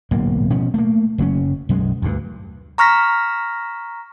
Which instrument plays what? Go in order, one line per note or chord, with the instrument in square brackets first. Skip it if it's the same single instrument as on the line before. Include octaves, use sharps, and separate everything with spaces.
[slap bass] D1 B1 G#2 A#3
B2 F3 C#4
A3 A#3
F#1 F#3 C#4
B1 F#2 F3 G#3
D2 G2
[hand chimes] A#5 C#6 F6 A#6 B6